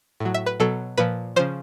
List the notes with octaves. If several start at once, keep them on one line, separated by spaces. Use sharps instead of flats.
A2 F#3
E5
B4
B2 F#3 A4
A#2 F3 B4
C#3 F3 C5